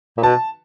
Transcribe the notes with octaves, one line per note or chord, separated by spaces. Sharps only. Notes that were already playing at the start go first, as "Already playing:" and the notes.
A#2
B2 A5